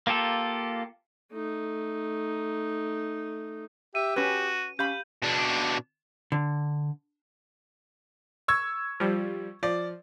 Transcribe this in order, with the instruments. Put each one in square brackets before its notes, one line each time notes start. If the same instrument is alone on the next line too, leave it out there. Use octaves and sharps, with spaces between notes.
[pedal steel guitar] A#3 F4 G4 A4
[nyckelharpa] A3 D#4
[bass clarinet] G4 [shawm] E5 [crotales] D#7
[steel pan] C#4 B4 [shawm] F#4
[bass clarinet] C#4 [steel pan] G4 F5 B5 [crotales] G6
[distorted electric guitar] B2 D4
[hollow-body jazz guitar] D3
[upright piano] C#6 E6 G#6
[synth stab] F3 G3
[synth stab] F3 [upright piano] D5